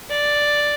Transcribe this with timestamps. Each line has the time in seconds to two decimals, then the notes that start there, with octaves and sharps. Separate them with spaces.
0.10 D5